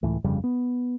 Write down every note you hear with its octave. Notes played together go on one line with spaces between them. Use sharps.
C#2 A2 E3
G1 F2 C#3 G3
B3